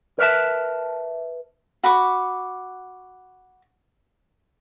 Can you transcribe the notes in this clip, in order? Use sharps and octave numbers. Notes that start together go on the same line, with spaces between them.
A#4 B4 C#5 E5 A5
F#4 B5 C#6 D6